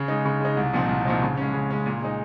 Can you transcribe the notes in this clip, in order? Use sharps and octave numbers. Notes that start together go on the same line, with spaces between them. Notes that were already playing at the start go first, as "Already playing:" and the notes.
Already playing: C#3
G#3 D#4
C#3
G#3 D#4
C2
A#2 F3 C4 D#4
C2
A#2 F3 C4 D#4
C#3
G#3 C#4
C#3
G#3 C#4
A#2
G#3 D#4